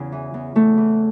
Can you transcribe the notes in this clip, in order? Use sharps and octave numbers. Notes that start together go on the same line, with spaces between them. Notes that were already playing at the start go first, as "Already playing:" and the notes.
Already playing: E2 C#3
E3
E2
E2 A3
E3